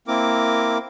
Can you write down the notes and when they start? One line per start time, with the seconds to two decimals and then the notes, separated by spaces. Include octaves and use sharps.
0.08 A#3 C4 E4 A#4 D6